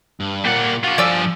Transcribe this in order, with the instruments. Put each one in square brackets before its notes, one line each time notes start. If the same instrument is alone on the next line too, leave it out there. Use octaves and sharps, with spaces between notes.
[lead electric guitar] G2
[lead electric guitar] A#2 A#3 [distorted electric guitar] G3 F#5
[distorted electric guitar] D4 F4 [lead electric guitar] F#4
[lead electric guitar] G2 G#5 [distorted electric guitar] F3 [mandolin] D5 E6